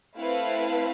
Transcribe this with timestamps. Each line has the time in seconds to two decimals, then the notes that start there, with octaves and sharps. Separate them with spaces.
0.16 A3 C4 E4 B4 F5